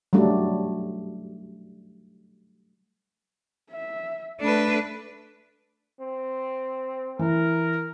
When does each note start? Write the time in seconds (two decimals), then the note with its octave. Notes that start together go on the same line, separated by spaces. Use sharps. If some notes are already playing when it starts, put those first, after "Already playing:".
0.13 F#3 G3 A3 D4
3.71 E5
4.41 A3 D4 B4
6.00 C4
7.19 E3 A#4